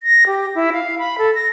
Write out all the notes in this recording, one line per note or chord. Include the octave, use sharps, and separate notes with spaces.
A#6
G4
E4
F5
B5
A4
A#6